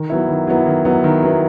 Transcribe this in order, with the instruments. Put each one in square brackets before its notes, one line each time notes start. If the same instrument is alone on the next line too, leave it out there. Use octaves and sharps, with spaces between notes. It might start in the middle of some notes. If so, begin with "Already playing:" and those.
Already playing: [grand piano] D#3
F#3 B3 E4
D#3
F#3 B3 E4
D#3
F#3 B3 E4
D#3
F#3 B3 E4